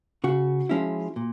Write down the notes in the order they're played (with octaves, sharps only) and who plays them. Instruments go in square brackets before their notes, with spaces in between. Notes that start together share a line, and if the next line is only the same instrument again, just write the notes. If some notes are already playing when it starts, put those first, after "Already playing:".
[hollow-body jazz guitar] C#3 F#4
F3 G#3 C#4 E4
A#2